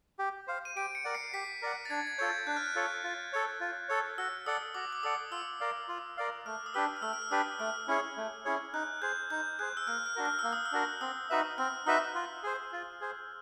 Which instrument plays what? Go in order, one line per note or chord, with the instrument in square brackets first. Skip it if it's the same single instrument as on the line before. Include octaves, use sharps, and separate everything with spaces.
[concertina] G4
C5 F5
[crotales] D#7
[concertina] G4 [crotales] D7
[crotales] C#7
[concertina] A#4 D5 F#5
[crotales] C7
[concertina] G4 [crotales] B6
[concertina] A#4 D5 F#5
[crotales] A6
[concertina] D4 [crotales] G#6
[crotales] G#6
[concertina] F4 A4 C#5 [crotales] G6
[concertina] D4 [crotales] F#6
[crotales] F6
F#6
[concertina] F4 A4 C#5
F4
A4 C#5
F4
A4 C#5
[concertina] F#4 [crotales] E6
[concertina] A4 D5 F#5 [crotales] D#6
[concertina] F#4 [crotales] D6
[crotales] D6
[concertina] A4 D5 F#5 [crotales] D#6
[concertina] F4 [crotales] E6
[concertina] A#4 D5 F5
F4
A#4 D5 F5
[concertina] A3 [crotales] F6
[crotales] D#6
[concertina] D4 G4 B4 [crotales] E6
[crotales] F6
[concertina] A3 [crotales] E6
[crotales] F6
E6
[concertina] D4 G4 B4 [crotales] D#6
[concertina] A3 [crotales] F6
[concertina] C#4 E4 G#4 C#5
A3
C#4 E4 G#4 C#5
[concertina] D#4 [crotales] F#6
[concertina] G#4 C5 [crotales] G6
[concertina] D#4 [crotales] G6
[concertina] G#4 C5 [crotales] F#6
[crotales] E6
[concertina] A#3 [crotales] F6
[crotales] F6
[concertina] D4 F#4 A#4
[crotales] F6
[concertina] A#3 [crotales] E6
[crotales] D#6
E6
[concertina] D4 F#4 A#4
[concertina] C4 [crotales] D#6
[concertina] D#4 F#4 B4 E5
[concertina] C4 [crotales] F6
[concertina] D#4 F#4 B4 E5 [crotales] E6
[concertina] F4
G#4 C5
F4
G#4 C5